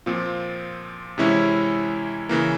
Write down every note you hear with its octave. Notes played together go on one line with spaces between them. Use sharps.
A#2 F3 C4 F4
C3 E3 G#3 C#4 E4
C#3 E3 A#3